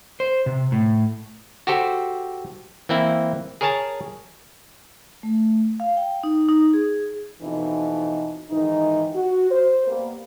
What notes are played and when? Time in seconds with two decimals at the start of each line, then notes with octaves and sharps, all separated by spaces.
0.20 C5
0.46 C3
0.72 A2
1.67 F#4 G4 A4 C5
2.89 E3 A#3 C4 E4
3.61 G#4 A#4 C#5 G#5 A5
5.23 A3
5.80 F5
5.97 G5
6.24 D#4
6.49 D#4
6.74 G#4
7.42 F2 B2 E3 D#4
8.50 G#2 D#3 E3 D#4
9.14 F#4
9.51 C5
9.87 G3 A#3 B3